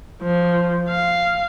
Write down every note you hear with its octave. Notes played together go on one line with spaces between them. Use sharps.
F3
F5